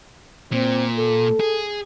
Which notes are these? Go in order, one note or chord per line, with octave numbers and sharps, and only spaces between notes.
A#2 C4
A4
G#4